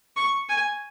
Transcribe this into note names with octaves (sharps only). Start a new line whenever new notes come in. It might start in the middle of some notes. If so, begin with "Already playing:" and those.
C#6
G#5